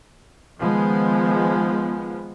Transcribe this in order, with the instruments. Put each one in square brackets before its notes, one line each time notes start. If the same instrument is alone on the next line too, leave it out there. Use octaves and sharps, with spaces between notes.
[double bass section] D#3 F3 G#3 B3